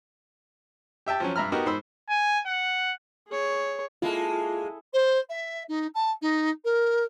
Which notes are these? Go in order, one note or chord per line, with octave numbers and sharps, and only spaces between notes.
G4 E5 G5 A5
F3 F#3 C#4
G2 E5 A#5 B5 F6
B3 D#4 F#4 G4 A#4
G#2 C5 B5 E6
G#5
F#5
G#4 C#5
G#3 A#3 E4 F4 G#4 A4
C5
E5
D#4
A5
D#4
A#4